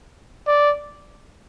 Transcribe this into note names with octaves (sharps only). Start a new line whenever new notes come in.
D5